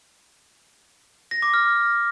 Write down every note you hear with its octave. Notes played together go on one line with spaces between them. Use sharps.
A#6
D6
F6